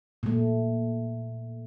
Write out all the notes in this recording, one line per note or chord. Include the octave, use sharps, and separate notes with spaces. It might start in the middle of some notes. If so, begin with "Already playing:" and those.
A#2 A3